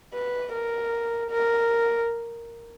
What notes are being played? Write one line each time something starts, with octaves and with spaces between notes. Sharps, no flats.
B4
A#4
A#4